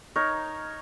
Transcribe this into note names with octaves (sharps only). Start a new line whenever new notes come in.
D#4 A#4 C#5